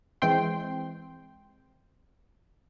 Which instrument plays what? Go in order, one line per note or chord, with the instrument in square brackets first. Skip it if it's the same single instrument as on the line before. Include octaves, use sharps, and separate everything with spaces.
[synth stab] E3 G#3 C4 G5 C6